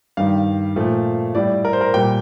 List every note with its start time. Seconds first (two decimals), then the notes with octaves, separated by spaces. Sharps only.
0.17 G2 D#3 G3 F5
0.76 A#2 F3 A3
1.35 A2 G3 D5
1.65 A#4
1.73 C5
1.81 A#4
1.94 A#2 G3 G5